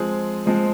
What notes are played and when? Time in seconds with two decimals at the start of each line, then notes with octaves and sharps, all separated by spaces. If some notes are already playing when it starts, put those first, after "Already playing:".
Already playing: F3 G#3 C4 G#4
0.46 F3 G#3 C4